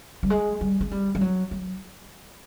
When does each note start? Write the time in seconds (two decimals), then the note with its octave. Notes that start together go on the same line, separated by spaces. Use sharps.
0.23 G3
0.30 G#3
0.61 G3
0.81 G#3
0.91 G3
1.15 G3
1.21 F#3
1.51 F#3